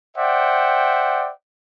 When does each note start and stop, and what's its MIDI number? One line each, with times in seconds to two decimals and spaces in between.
0.17 1.30 72
0.17 1.30 74
0.17 1.30 76
0.17 1.30 78
0.17 1.30 79